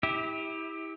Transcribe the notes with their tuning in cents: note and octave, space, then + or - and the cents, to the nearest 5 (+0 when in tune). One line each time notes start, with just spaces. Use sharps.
E4 -20 G4 +20 E5 -35